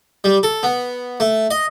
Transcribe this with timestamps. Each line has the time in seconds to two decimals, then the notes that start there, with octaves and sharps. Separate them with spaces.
0.24 G3
0.43 A4
0.63 B3
1.20 A3
1.51 D#5